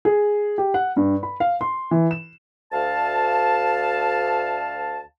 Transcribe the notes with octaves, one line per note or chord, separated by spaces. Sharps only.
G#4
G4
F#5
G2
B5
F5
C6
E3
E7
D2 F5 A5